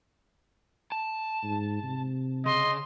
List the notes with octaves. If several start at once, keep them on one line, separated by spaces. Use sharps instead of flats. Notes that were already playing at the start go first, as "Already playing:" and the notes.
A5
G#2
C3
C#3 D#5 C6